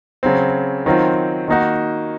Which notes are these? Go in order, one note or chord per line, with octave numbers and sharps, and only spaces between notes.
C#3 F#3 C4
D#3 F#3 C4 F4
D#3 A#3 D#4 F#4